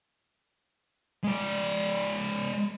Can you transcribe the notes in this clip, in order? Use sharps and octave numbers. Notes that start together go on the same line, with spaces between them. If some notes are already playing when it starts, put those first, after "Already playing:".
G#3 D5